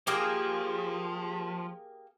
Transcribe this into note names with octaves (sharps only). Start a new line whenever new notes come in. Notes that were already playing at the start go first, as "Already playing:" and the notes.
F3 A#3 G4 G#4